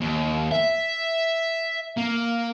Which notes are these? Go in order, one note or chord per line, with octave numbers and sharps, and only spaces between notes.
D#2
E5
A#3